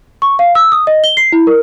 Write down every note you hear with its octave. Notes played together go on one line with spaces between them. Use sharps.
C#6
F5
E6
D#6
D#5
G7
C7
E4
A#4